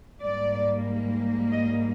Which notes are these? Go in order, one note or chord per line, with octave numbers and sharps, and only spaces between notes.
G#2 G3 A#3 D5
D#5